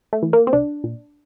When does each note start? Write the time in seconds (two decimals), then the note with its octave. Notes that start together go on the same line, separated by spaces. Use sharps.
0.13 A3
0.23 E3
0.33 A#3
0.47 C4
0.53 C2 D4
0.84 A#2